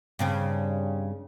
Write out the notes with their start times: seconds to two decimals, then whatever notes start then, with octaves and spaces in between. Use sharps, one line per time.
0.19 G2 C#3 C4